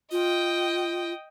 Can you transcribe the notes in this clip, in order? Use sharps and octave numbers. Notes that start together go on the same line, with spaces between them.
F4 D#5 G5